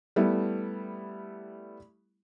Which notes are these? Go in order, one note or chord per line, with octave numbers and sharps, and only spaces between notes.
G3 A3 B3 E4